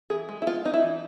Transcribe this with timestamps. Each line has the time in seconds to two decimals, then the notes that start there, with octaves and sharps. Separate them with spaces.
0.10 E3 G#4
0.29 G#3
0.42 E4
0.47 B3 F4
0.65 D4 D#4
0.74 E4
0.83 E3